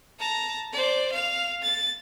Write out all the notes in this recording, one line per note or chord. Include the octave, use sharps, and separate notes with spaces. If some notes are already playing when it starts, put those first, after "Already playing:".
A5 A#5
C5 D5
F5 F7
A6